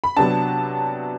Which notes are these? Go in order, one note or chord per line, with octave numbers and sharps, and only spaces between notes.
B5
C3 F#3 B3 D4 A5